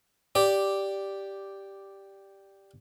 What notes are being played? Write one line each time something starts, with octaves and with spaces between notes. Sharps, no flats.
G4 D5